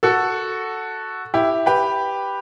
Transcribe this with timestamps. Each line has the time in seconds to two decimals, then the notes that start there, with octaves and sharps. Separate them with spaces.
0.03 F#4 A4
1.34 E4 G4
1.66 G4 B4